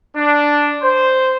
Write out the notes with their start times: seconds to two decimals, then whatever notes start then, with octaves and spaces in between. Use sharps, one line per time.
0.16 D4
0.83 C5